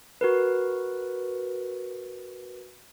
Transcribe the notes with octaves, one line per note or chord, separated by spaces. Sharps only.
F#4 A#4 B4